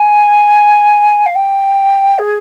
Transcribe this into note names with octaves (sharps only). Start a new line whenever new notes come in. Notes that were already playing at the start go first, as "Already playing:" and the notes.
Already playing: G#5
F5
G5
G#4